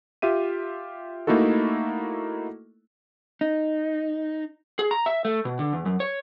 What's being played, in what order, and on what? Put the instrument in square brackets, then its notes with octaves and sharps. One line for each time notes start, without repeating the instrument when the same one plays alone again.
[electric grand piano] F4 G4 E5 D#7
A3 A#3 D#4 E4 F#4 A4
[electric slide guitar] D#4
G#4
A#5
E5
A3
B2
D3
E2
F#2
C#5